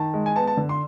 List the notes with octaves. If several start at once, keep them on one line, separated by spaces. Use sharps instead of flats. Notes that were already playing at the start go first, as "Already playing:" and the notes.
Already playing: D#3 A5
G#3
G#5
B3 A5
A5
D3
C6